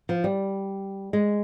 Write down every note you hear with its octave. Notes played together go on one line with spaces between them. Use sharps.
F3
G3
G#3